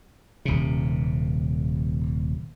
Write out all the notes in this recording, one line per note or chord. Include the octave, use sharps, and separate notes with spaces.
D#1 C3